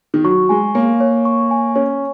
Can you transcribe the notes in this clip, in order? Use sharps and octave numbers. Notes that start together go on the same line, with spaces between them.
D#3
F#3 C#6
G#3 G#5
A#3 C#5
C#5
C#6
G#5
C#4 C#5